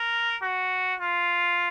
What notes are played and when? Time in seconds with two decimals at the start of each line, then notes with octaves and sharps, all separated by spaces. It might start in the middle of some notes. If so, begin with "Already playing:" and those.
Already playing: A#4
0.42 F#4
1.00 F4